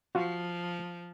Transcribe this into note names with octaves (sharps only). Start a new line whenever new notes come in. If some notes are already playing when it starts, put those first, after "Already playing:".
F3 F4 F#4